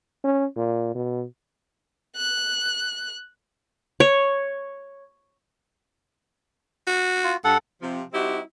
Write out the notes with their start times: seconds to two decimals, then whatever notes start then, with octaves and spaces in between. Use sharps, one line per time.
0.24 C#4
0.56 A#2
0.95 B2
2.16 F#6
4.00 C#5
6.87 F#4
7.24 F4
7.44 G2 A4 F#5
7.80 C3 F3
8.12 G3 C4 D#4 E4 F#4 G4